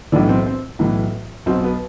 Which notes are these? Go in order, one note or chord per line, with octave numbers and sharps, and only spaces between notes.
B1 A2 E3 D4
C4
C4
B1 A2 E3
B1 B2 C4
B3